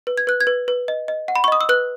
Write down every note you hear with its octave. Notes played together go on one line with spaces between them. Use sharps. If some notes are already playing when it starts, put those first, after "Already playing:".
B4
G#6
B4 F#6
G#6
B4
B4
D#5
D#5
F#5
B5
C#6
D#5 D#6
E6
B4 F#6